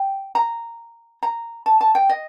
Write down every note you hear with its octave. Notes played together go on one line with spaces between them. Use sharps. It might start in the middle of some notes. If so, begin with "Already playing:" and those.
Already playing: G5
A#5
A#5
A5
A5
G5
D#5